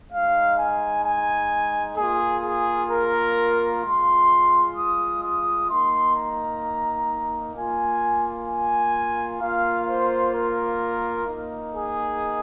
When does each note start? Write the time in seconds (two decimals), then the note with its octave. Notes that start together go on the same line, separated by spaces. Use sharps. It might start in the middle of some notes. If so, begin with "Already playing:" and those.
0.12 G#3 D#4 F5
0.58 G#5
1.05 G#5
1.98 A#3 F4 G#4
2.44 G#4
2.91 A#4
3.84 G#3 F4 C6
4.77 D#6
5.24 D#6
5.70 A#3 D#4 C6
6.16 A#5
7.55 A#3 F4 G#5
8.49 G#5
9.41 A#3 F4 F5
9.88 C5
10.35 A#4
11.27 A#3 D#4
11.74 G#4